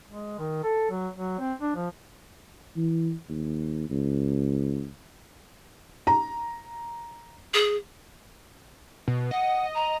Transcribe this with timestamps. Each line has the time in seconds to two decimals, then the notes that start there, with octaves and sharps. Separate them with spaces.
0.07 G#3
0.39 D#3
0.64 A4
0.91 F#3
1.16 F#3
1.39 C4
1.61 D4
1.76 F3
2.77 E3
3.29 D#2
3.90 C#2
6.07 A#5
7.54 G#4
9.08 B2
9.31 D#5 F#5
9.74 A#5